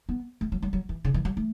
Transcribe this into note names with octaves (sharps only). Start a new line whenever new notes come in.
B3
A3
F#3
F#3
F#3
E3
C#3
E3
F#3
A3